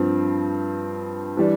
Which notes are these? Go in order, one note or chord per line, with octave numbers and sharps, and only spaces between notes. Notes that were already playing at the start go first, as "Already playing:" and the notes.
Already playing: G2 F3 C4
E3 G3 D4